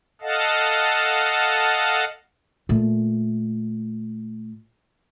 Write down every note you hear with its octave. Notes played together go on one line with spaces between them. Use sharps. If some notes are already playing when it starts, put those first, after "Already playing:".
A4 D#5 F5 F#5 A5
A#2 A3